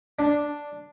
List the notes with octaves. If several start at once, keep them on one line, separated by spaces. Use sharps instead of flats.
D4